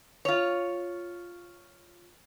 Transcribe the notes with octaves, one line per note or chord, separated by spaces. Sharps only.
F4 C#5